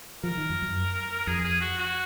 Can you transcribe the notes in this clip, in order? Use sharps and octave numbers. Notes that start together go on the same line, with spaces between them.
F3 A#4
D#3
F#2
F#2
F2 G#4
G#4
F#4
F#4